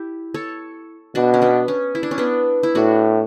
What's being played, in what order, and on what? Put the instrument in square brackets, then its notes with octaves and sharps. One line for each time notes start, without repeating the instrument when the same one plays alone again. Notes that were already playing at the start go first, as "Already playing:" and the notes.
Already playing: [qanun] E4 G4
A4 C#5
[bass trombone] B2 [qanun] D4 F#4
[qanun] C#4
B3 D4
C#4
E4
D4
C#4
B3 D4
E4
[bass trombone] A2 [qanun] D4 F#4